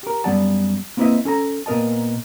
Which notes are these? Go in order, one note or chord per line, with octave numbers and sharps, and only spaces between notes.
G4 A#4
F#2 G3 B3 D5 F#5 A5
A#3 C4 E4 B4 D#5 E5
C#4 A4 A5 A#5
A#2 B3 A#4 D#5 A5